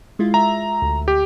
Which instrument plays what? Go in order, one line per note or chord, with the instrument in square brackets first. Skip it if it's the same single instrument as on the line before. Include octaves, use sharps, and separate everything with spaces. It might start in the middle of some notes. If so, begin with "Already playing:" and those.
[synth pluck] G#3 E4 F4
[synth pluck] E5 [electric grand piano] A#5
[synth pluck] D2
[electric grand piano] G4